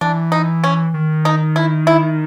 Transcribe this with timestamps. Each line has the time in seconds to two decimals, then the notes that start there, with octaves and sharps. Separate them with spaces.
0.01 E3 D4
0.32 D#4
0.64 C#4
0.94 D#3
1.25 D#4
1.56 E4
1.87 E4